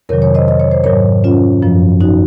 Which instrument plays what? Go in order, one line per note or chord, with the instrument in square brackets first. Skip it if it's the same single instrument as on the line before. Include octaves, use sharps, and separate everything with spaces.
[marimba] F2 C3 D#3 F#3 A#4 C#5
A#4 C#5
C5 D#5
D#5
C#5
C5
G#2 F#3 A#4 C#5
C#4 F4
F#2 F3
D#4 F#4